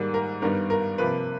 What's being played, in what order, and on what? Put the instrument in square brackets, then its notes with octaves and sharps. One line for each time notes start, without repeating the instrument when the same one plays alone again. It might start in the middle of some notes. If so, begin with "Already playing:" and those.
Already playing: [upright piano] G#2 D#3 G3 A#3
A#4
G2 D#3 G3 B3 A#4
A#4
C3 F3 A#3 B4